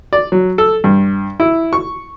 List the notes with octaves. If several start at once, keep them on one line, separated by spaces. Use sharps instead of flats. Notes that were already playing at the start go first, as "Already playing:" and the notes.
D5
F#3
A4
G2
E4
C#6